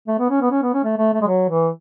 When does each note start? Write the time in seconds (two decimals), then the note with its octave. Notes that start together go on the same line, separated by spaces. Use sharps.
0.08 A3
0.19 B3
0.30 C#4
0.41 B3
0.51 C#4
0.62 B3
0.74 C#4
0.84 A3
0.98 A3
1.13 A3
1.21 G#3
1.27 F#3
1.49 E3